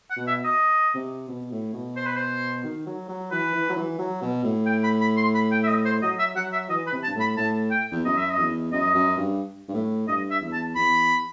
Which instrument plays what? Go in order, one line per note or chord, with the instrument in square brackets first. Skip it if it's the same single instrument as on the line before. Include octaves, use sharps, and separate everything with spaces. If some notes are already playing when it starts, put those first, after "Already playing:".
[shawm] F#5
[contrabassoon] B2
[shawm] E5
D#5
[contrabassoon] C3
B2
A2
B2
[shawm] C5
B4
C5
[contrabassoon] D#3
F#3
F#3
[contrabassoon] E3 [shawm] B4
[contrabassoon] E3
F#3
E3
F#3
B2
A2
[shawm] G5
B5
B5
C6
B5
G5
E5
D#5
C5
[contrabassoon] F#3 [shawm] D#5
[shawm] E5
[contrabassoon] F#3 [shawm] F#5
[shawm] E5
[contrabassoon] E3 [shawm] D#5
[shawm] B4
[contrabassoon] C3
[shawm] A5
[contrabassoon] G2
A2
[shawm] B5
[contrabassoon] A2 [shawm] A5
[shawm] G5
[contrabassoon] E2
[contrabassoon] F#2 [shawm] D#5
[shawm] E5
D#5
[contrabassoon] E2
[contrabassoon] F#2 [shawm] D#5
[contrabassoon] F#2
G2
G2
A2
[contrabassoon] G2 [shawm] D#5
[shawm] E5
[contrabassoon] E2
[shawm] A5
[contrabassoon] E2 [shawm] B5